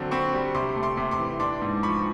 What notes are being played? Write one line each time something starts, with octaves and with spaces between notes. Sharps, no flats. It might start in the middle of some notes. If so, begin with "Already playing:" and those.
Already playing: D3 F#3 C4
C4 B5 C#6
G3
C3 C6 D6
A3
C6 D6
C3
C6 D6
E3
D4 C6 D6
G#2
F3 B5 C#6